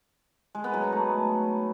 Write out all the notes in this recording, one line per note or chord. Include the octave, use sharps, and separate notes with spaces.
G#3
B3
F#3
D#4
A3